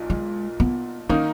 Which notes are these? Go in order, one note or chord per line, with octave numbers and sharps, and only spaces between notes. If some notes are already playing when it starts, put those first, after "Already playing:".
Already playing: B1 A#2
G#3
B3
D#3 A#3 C#4 D#4